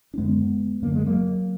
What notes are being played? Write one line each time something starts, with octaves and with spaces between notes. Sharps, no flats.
D4
F#2 D3 G#3 B3
F#2 D3 A#3
G#3
F#3 A#3